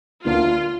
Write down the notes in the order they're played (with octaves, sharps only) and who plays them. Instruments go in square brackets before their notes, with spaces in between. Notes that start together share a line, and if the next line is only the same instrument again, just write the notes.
[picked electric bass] D2 D3 A#3 D4 [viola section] F4